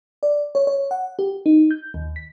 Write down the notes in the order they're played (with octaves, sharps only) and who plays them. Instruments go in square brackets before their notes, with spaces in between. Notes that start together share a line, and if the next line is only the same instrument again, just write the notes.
[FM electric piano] D5
C#5
C#5
F#5
G4
D#4
G6
D#2
B6